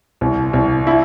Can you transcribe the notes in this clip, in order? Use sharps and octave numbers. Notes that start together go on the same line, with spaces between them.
C2
C2
E4